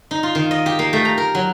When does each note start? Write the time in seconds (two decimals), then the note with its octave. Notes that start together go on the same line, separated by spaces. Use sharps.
0.11 D#4
0.23 F4
0.35 D#3
0.51 D#5
0.66 G4
0.79 A#3
0.93 A3
1.05 A#5
1.18 A#4
1.35 F#3